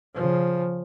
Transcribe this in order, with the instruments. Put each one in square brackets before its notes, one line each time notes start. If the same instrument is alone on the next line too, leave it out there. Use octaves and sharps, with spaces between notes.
[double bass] C#3 F3